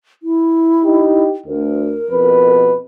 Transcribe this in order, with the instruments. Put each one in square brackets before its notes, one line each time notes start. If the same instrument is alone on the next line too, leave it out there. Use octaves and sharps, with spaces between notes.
[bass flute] E4
[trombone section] D#4 G4
[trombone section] D2 [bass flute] A#4
[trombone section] F2 B2 B4